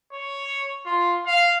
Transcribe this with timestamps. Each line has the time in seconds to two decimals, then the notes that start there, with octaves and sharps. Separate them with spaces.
0.13 C#5
0.85 F4
1.26 F5